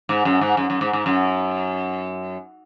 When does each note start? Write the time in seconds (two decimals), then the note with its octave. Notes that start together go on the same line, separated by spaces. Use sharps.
0.09 G#2
0.25 F#2
0.41 G#2
0.57 F#2
0.70 F#2
0.81 G#2
0.93 G#2
1.06 F#2